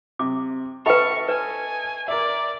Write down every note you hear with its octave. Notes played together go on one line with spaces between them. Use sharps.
C3 D6
A4 B4 D#5 E5 G5 B5 C#6
B4 G#5
A#4 D5 E5